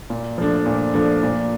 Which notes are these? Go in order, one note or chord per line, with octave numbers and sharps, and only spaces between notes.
A#2
F3 A3 D4
A#2
F3 A3 D4
A#2